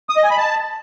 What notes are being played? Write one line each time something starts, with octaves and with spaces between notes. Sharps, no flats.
D#6
D#5
G#5
B5
A5